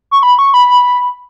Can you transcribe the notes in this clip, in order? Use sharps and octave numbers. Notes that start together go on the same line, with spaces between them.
C#6
B5
C#6
B5